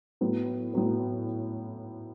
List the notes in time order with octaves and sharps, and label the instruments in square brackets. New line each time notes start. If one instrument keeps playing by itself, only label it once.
[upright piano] A2 F#3 B3
A2 F#3 B3